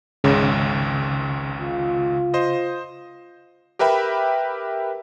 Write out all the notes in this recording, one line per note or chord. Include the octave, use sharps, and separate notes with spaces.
G#1 C#2 G#2 C#3
F4
C5 D#5
G4 A#4 B4 E5 G5 B5